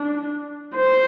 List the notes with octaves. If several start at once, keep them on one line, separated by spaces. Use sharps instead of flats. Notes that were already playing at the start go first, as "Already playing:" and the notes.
Already playing: D4
C5